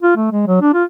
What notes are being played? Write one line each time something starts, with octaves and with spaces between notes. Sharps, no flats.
F4
A3
G#3
F#3
D4
F4